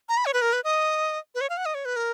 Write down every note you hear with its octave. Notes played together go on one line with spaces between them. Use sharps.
A#5
B5
C#5
B4
A#4
B4
D#5
B4
C#5
F5
F#5
D#5
C#5
B4
A#4